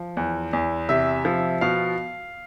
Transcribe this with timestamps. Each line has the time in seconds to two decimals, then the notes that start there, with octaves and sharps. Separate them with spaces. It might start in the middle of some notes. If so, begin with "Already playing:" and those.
Already playing: F3
0.17 E2
0.53 E2
0.89 C3 E5
1.25 F3
1.61 B2 F5